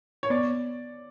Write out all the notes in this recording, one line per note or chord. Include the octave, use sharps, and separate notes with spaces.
C#5
B3 D5